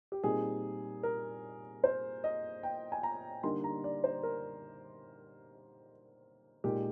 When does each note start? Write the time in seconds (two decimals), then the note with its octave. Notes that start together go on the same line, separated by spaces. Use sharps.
0.12 G4
0.24 A#2 G3 C4 D#4 G#4
1.03 A#4
1.84 C5
2.24 D#5
2.63 G5
2.92 G#5
3.03 A#5
3.43 D3 G3 A#3 D#4 C6
3.64 A#5
3.84 D5
4.04 C5
4.23 A#4
6.64 A#2 G#3 D#4 G4